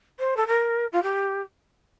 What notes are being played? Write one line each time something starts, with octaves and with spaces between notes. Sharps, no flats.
C5
A4
A#4
F4
G4